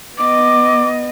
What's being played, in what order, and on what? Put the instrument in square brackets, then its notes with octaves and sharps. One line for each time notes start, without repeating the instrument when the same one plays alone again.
[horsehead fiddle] B3 D#5 [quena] D6